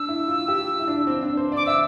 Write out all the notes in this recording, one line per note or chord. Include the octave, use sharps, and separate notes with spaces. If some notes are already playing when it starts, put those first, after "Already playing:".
Already playing: D4 E6
E4
F4
G4
E4
D4
C4
D4
C5
D5 D6
E5 E6